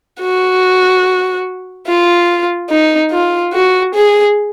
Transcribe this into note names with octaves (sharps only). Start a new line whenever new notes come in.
F#4
F4
D#4
F4
F#4
G#4